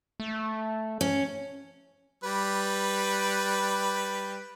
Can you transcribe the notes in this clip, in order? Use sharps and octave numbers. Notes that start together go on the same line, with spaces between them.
A3
C#4
G3 B4